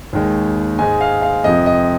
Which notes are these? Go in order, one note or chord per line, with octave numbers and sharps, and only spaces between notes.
D#2 D#3 G#3
G#2 G#3 G#5
F5
F5
F2 C3 F3 D#5
D#5